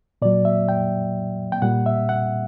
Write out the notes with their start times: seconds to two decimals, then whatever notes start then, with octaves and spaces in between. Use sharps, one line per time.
0.22 A#2 F#3 D5
0.45 E5
0.69 G5
1.52 G5
1.62 A#2 G3 F#5
1.86 E5
2.09 F#5